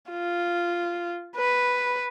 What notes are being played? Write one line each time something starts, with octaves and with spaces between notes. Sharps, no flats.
F4
B4